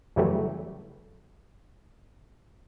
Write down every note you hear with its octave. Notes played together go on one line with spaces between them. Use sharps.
F2 C#3 E3 F#3 G3 A3